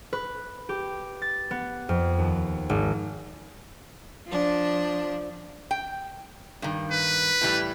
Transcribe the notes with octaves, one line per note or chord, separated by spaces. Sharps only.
B4
G4
A6
B3
F2
D#2
G#1
F3 D4
G5
G2 D#3
B4
A2 E3 G3